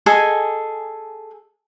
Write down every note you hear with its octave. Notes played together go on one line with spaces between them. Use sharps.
G#4 A4 D#5 G#5